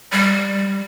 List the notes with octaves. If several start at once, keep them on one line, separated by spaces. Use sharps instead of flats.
G3